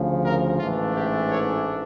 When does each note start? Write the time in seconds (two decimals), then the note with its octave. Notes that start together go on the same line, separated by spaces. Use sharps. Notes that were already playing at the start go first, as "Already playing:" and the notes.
Already playing: D2 C#3 F3
0.25 A#4
0.59 A1 G#2 E3 A3 D4 F4
0.95 G4
1.29 C#5